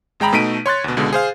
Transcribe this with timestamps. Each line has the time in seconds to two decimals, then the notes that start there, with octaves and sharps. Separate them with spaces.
0.20 G#1 G#3 G5 A#5 B5
0.33 B2 A3 D#4 B6 D7 D#7
0.66 C#5 C6 F#6 A6
0.84 D2 B2
0.97 C#2 B2 D3 G#3
1.13 G#4 C5 F5